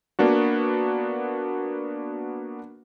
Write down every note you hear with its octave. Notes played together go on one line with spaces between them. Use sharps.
A#3 B3 D4 F#4